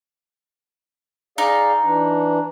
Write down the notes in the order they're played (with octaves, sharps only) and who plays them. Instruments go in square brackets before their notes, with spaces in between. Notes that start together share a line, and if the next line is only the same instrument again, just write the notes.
[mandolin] D#4 [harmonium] G#4 D5 F5
[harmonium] E3 D4